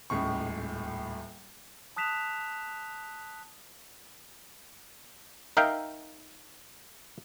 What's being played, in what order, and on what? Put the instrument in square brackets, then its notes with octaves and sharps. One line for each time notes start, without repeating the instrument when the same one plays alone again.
[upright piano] D#1 C#2 A2 C#6
[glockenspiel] A5 D#6 F#6 B6 E7 F7
[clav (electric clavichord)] D#4 A#4 E5 F5 G5